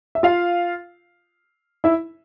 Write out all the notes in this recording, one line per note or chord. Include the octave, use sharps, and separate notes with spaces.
E5
F4 F5
E4 E5